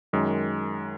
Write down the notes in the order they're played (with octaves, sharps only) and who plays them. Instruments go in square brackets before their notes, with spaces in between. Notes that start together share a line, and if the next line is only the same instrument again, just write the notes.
[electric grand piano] F#2 D#3 G#3